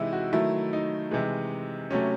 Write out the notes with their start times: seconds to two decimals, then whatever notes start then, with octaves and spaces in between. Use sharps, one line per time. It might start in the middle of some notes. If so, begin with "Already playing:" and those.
Already playing: C3 E3 G#3 D#4 E4
0.13 F#4
0.33 D#3 F#3 A3 E4
0.73 D#4
1.11 C3 E3 G#3
1.91 C3 F#3 A3 C#4